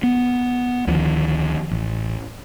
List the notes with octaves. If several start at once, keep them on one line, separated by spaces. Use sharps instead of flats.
B3
D2 D#3 F3
A1